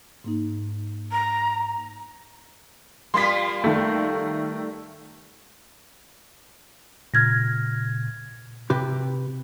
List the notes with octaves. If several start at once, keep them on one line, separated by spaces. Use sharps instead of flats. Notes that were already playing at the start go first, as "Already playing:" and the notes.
G#2 A#3 D#4
A#5
G3 A#3 F4 C6 B6
D#3 A3
A#2 C#3 F6 G#6 A#6
C3 G4 B4